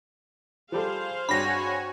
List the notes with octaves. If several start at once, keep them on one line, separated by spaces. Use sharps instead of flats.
F3 G3 G#4 A4 C5 F5
G2 C4 D4 F#4 C#5 G#5 B5 A#6